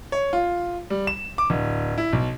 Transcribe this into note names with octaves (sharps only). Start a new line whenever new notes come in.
C#5
F4
G3
E7
D6
D1
E4
B1